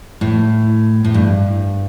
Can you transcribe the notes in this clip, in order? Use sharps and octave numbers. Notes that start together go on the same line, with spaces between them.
A2
A2
G2